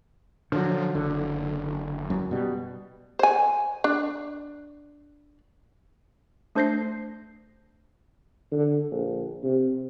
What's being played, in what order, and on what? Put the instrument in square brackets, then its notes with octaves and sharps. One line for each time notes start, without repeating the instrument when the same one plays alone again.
[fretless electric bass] D3 D#3 F#3 [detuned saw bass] F3
[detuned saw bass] F#1 [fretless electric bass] D3
[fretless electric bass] F#2
B2 G3
[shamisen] C5 G#5
D4
[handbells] A3 D4 C5 G6 A#6 C7
[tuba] D3
A#1
C3